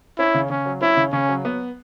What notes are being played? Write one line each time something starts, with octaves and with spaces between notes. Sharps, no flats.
C#4 E4
C#3
C#3 C#4
F#3
C#4 E4
C#3
C#3 C#4
F#3
B3